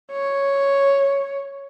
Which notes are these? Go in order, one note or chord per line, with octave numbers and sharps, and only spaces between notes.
C#5